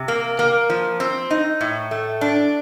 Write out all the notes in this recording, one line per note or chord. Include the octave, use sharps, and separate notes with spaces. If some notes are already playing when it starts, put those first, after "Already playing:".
Already playing: C3
A#3
A#3
F3
C4
D#4
A2
A3
D4